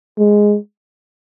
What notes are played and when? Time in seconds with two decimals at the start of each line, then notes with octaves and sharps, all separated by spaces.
0.18 G#3